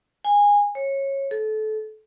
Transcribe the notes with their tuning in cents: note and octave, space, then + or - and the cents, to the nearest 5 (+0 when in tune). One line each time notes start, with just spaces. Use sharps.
G#5 -20
C#5 -20
A4 -25